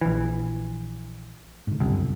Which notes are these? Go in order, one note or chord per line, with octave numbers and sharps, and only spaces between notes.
A#1 E3
G#2 D3
G1 C#2 F#2 C3